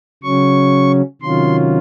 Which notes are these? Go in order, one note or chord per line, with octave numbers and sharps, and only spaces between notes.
C#3 F#3 C#4 C#6
C3 D#3 F#3 C#4 F4 C6